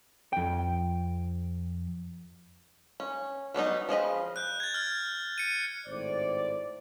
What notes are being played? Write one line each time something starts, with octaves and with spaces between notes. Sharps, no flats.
F2 G5
C#4
F#3 G3 B3 D#4
F3 G#4 D#5 B5
F#6 G6
G#6 A6
F6 A6
C#7 D#7
G#1 A2 C5 D5